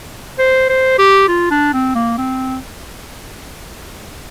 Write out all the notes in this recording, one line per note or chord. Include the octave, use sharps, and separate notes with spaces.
C5
C5
G4
F4
D4
C4
A#3
C4